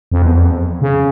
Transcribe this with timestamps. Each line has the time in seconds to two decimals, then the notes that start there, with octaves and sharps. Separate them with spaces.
0.12 F2
0.22 E2
0.37 F2
0.82 C#3